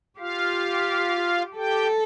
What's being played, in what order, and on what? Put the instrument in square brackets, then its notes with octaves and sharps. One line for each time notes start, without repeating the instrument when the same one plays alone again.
[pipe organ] F4 F5 [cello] G4
[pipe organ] G4 G5 [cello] A4